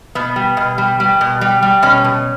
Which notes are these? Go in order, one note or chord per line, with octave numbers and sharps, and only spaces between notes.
B2 B3
G3
B2
G3
G3
B2
G3
G3
B2 C#4
B2